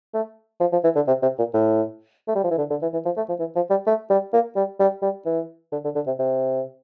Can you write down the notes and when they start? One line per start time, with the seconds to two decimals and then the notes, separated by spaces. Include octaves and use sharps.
0.14 A3
0.60 F3
0.72 F3
0.84 E3
0.96 D3
1.07 C3
1.22 C3
1.39 A#2
1.54 A2
2.28 A3
2.35 G3
2.44 F3
2.51 E3
2.58 D3
2.70 D3
2.82 E3
2.93 E3
3.05 F3
3.17 A3
3.29 F3
3.40 E3
3.56 F3
3.70 G3
3.87 A3
4.10 G3
4.33 A#3
4.56 G3
4.80 G3
5.02 G3
5.26 E3
5.72 D3
5.84 D3
5.95 D3
6.06 C3
6.19 C3